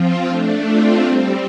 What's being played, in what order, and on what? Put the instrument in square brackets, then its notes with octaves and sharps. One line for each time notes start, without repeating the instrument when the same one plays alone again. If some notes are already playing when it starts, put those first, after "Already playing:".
Already playing: [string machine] F3 C4 F4
A3 D4
C4 F4
G3 C4